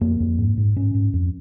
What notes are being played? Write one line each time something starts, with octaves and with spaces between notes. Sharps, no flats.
F2 A#3
F2
G#2
G#2
G#2 C#4
G#2
F2